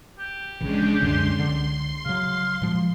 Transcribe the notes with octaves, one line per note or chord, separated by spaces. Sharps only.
G4
A#1 C#3 E3 G#3 C#4 D4
C2 F#2 D3 C6
C#2 D3
C#3 F#3 F5
A#2 F3 G#3